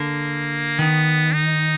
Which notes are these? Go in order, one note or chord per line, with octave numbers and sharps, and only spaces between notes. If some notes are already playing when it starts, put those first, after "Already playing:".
Already playing: D3 A#3
D#3 B3
D#4